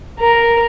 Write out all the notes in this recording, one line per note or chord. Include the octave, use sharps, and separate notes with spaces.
A#4